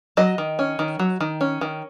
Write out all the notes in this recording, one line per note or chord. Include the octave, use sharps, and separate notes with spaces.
F#3 D#5
D#3
C#4
D#3
F#3
D#3
C#4
D#3